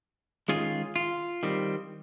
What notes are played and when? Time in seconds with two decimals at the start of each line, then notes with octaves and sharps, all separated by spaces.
0.48 D#3 G#3 C#4 F4 G#4
0.96 F4
1.43 D#3 G3 C4